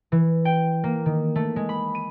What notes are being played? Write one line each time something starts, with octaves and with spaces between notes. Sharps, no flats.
E3
G5
A#3
D#3
A3
G#3
B5
D#7